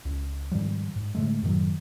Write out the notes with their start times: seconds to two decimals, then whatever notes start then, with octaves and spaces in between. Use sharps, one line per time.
0.05 C#2
0.51 G#2 D#3 F3 G3
0.96 G#2
1.15 A2 D3 G#3 A3
1.42 F#2 A2 D#3 F#3